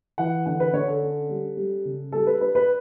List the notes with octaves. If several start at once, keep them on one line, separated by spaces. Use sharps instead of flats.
E3 F#5
D3 F#5
B4
D3 C#5
A4
C#4
G3
G3
C#3
G3 A4
B4
D4 B4
B4